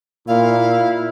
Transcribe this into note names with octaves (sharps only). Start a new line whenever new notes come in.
A#2 E4 F5